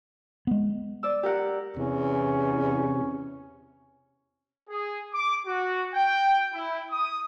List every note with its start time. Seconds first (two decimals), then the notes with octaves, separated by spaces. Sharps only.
0.47 G#3 B3
1.03 D5 E6
1.23 G4 A#4 F#5
1.77 E2 C3 C#4
4.70 G#4
5.14 D6
5.47 F#4
5.94 G5
6.54 E4
6.91 D#6